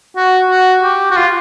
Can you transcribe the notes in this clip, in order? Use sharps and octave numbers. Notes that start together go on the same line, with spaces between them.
F#4
F#4
G4
F#4
F4